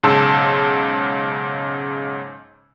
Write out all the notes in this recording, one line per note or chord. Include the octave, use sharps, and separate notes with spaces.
B1 G#2 C#3 A5 C6 E6